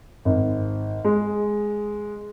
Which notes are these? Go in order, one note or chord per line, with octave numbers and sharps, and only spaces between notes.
G#1
G#3